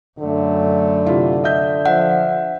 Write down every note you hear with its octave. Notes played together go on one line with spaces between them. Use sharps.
F#2 D3 A3
C3 E4 F4
D#5 E5 G6
F3 E5 F#5